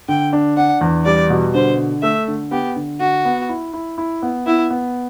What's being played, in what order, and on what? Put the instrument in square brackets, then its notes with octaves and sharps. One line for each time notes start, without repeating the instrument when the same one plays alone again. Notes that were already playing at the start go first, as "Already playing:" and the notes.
[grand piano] D3 [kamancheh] G5
[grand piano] D4
[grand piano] D4 [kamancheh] F#5
[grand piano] E2
[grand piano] G3 [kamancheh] D5
[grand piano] B2
[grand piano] D3 [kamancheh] C5
[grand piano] D3
[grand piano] A3 [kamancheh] E5
[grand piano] D3
[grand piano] B3 [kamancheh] G4
[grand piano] D3
[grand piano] D3 [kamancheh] F#4
[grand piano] B3
E4
E4
E4
B3
[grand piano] B3 [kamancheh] E4
[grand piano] B3